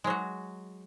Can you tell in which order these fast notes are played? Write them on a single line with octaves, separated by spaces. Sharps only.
G#3 F#3 F#4